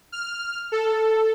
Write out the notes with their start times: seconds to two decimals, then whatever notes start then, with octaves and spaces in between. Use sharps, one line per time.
0.12 F6
0.72 A4